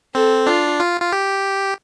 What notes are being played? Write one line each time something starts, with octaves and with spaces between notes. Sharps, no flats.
C4 A4
D4 F4
F4
F4
G4